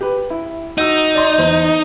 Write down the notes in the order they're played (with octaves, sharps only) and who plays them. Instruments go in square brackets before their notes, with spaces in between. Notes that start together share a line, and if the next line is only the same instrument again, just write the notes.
[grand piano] G4 B4
E4
[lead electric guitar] D#4 [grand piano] F#4 E6
[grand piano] D5 C6
E2 C5